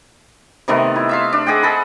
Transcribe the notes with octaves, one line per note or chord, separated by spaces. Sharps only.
C3 D#3 A3 B3
E4
E5 F5 C6
D4
G#4 D#5 F#5 G5
G#4 A4 B5